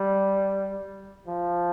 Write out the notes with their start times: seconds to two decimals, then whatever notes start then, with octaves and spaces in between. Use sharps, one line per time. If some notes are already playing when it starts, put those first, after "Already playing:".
Already playing: G3
1.28 F3